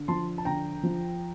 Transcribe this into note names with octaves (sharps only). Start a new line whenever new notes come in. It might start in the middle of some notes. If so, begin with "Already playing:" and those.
Already playing: D3
F3 A5 C6
A5
D3 G5 A#5
F3